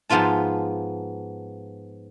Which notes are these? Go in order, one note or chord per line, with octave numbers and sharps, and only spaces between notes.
G#2 F3 B3 F4 A5